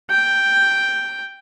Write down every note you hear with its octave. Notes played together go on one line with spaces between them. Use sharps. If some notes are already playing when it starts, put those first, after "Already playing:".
G5